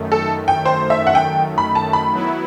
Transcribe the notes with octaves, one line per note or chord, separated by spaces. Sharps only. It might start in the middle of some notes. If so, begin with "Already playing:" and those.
Already playing: F#2 D#3 A3
A4
G5
C5
E5
F#5
G5
B5
A5
B5
F#3 B3 E4